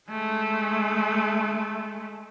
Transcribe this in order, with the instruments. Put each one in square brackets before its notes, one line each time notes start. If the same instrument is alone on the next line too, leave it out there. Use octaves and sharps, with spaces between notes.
[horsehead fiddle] G#3 A3